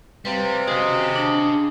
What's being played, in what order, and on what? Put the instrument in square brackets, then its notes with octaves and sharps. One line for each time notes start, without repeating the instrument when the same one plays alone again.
[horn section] C3 [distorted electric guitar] G3 [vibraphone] B4 F5
[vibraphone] F#4 [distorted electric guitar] G#4 F5 [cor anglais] D#5
[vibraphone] D4 A5